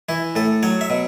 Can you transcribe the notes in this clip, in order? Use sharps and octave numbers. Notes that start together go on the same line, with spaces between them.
E3 E4
A2 A4
F#3 C#5
E5
B2